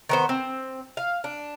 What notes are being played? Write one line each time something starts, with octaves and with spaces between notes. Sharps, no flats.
D#3 B3 C5
C4
F5
D4